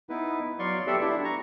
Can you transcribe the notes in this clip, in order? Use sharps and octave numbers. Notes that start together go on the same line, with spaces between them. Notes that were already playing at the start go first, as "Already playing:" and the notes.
B3 D#4 E4 B4
F#3 D5 F5 C6 C#6
B3 G4 A4 D5 E5 F#5
D4 E4
A#5 C#6